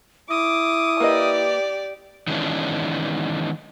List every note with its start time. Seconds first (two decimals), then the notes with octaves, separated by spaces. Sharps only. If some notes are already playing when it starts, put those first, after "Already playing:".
0.30 E4 D6 D#6
1.00 A#3 G4 B4 D5 D#5
2.27 D#3 E3 G#3 B3 C#4 D4